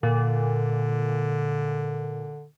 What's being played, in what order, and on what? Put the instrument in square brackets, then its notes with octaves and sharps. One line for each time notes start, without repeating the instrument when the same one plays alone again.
[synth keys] A#2 [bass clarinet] D3